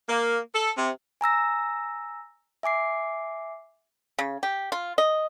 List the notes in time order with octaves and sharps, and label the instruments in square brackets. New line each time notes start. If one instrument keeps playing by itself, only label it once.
[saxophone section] A#3
A4
C3
[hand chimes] G#5 A#5 E6 A#6
E5 G#5 D6 C7
[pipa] C#3
G4
F4
D#5